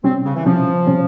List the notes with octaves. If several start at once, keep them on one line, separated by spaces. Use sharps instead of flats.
C3 G3 C4 C#4
C#3
E3
C3 F3 G3 C#4
C3 G3 C#4